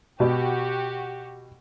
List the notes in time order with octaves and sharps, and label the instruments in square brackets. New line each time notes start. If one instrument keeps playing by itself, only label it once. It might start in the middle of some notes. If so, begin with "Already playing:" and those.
[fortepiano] B2 [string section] F#4 G4